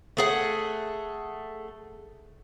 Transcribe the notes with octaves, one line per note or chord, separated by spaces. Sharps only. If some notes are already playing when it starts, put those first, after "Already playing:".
A3 G#4 F#5